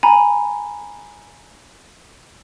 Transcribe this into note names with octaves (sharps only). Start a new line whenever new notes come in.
G#5 A#5 B5